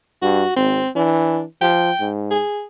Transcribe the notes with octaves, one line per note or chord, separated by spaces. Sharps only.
G2 F#4
G#1 C4
E3 D4
F3 G5
G#2
G#4